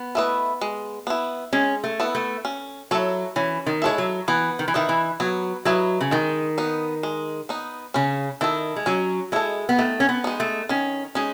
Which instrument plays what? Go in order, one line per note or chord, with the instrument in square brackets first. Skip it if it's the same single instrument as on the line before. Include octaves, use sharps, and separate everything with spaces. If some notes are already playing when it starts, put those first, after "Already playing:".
Already playing: [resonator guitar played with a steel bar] B3
[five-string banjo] A3 E4 B4 D#5
G#3
B3 E4
[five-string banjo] G#3 [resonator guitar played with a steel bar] C#4
[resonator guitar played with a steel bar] A3
[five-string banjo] B3 E4
[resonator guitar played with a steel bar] A3
[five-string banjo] C#4
[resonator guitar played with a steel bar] F#3 [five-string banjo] E4 A4 C#5
[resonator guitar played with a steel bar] E3 [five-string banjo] C#4
[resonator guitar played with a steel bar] D#3
[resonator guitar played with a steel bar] G#3 [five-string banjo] E4 A4 C#5
[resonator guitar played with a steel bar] F#3
[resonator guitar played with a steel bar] E3 [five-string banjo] B3
[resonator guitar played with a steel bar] D#3
E3
[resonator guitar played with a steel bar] D#3 [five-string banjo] E4 B4 D#5
[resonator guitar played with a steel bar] E3
[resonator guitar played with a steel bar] F#3 [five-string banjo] B3
[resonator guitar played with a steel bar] F#3 [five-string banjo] E4 B4 D#5
[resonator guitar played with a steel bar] C#3
[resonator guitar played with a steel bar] D#3 [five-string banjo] G#3
[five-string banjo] B3 D#4
G#3
B3 D#4
[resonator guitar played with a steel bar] C#3 [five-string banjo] C#4
[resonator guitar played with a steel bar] D#3 [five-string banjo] E4 A4
[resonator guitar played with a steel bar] G#3
[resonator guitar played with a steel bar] F#3 [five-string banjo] C#4
[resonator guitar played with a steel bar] G#3 [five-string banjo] E4 A4
[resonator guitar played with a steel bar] B3
[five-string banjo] D#3 [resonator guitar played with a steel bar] A3
[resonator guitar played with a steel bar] C#4
B3
[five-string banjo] G#3 D#4
[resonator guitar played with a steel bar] A3
[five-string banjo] D#3 [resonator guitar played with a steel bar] C#4
[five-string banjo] G#3 D#4 [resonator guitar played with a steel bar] C#4